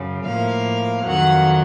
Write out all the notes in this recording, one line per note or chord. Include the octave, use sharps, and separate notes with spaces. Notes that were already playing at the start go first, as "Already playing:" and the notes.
Already playing: F#2 C#3
A2 F3 A#3 F5
F2 D#3 F#3 F#5